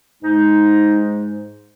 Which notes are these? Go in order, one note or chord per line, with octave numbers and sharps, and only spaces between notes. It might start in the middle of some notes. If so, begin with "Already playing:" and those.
G#2 G#3 D#4